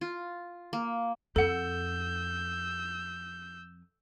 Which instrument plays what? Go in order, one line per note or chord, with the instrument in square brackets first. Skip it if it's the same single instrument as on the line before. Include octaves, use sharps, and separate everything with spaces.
[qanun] F4
A#3
[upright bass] F2 [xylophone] A4 F#5 [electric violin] E6 G6